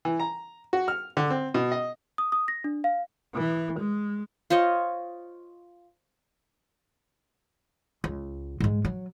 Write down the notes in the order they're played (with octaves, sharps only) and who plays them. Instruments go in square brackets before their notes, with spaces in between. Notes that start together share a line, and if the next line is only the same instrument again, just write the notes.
[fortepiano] E3
A#5
F#4
F6
D3
C4
B2
D#5
[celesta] D#6
D#6
A#6
D4
F5
[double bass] E3
G#3
[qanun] F4 C5 C#5 D#5
[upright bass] C#2
G#2 G#3
F#3